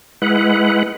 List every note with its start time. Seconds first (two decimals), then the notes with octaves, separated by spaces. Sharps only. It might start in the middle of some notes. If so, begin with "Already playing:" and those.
0.22 G#3 E4 B4 F#5